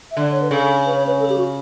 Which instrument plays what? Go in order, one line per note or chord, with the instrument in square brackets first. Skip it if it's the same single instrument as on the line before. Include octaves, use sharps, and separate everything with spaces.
[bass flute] E5
[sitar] D3 [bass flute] D5
[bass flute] C#5
B4
[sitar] C#3 [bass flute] A4
[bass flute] B4
C#5
B4
A4
G4
F#4